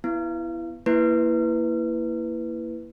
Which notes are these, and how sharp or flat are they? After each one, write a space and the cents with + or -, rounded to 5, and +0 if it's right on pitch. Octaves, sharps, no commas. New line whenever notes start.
B3 +0 E4 +15
A#3 +0 E4 +5 B4 +0